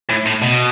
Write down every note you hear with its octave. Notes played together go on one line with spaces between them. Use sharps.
A2
A2
B2